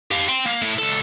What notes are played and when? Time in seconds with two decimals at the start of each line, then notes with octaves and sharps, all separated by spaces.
0.11 G4 F5
0.29 G5 C6
0.46 A#3
0.62 A2 E4
0.79 C#2 A4